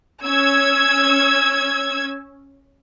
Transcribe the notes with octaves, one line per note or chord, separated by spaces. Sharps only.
C#4 E6 G#6